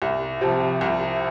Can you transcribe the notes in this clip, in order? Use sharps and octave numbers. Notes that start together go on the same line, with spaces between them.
C2
C3 F3
C2